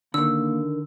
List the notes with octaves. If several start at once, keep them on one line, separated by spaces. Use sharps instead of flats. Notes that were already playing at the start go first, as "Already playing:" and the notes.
D3 D#3 A#3 E6